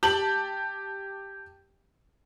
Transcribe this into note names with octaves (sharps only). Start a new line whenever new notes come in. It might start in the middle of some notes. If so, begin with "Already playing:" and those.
G4 A5 F#7